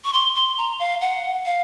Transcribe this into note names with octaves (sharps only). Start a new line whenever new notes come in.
C#6
C6
C6
A#5
F5
F#5
F5